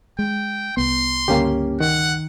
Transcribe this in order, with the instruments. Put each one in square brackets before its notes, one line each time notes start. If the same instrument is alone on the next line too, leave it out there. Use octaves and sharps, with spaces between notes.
[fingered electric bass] G#3 [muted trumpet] G5
[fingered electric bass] C2 B3 [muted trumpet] C6
[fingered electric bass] C#2 G2 D3 [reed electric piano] A#3 C#4 G4
[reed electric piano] D#3 [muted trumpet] F#5